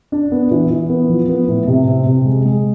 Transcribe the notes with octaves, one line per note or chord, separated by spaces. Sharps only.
D4
B3
E3
E3
B3
F3
B3
A2
C3
C4
C3
G#3
G#3